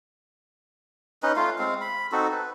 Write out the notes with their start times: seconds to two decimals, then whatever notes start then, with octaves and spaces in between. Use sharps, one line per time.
1.23 C#4 D#4 B4 D#5
1.36 A3 F4 F5
1.59 G#3 C4 F5
1.81 B5
2.12 C4 D#4 F#4 A4
2.32 B4